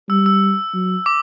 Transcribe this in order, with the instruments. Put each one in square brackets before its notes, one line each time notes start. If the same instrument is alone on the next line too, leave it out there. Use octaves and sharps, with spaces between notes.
[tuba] G3 [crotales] E6
[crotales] E6
[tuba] F#3
[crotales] D6